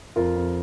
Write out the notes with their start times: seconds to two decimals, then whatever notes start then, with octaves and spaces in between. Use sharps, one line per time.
0.16 F2 F4 A#4
0.36 F2